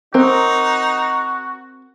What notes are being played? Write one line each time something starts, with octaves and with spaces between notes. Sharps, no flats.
C4 D#4 F#4 A#4